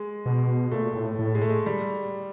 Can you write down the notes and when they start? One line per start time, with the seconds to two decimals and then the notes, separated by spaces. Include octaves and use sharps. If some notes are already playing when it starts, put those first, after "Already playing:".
Already playing: G#3
0.26 B2
0.72 A#2 A3
0.95 A2
1.19 A2
1.35 G#3
1.42 A3
1.50 G#3
1.66 G3